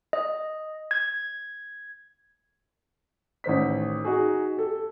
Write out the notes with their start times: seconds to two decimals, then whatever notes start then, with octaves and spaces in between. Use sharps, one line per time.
0.13 D#5
0.91 G#6
3.44 A1 D#3 C5 B6
4.05 D#4 F#4 G#4
4.56 G4 A4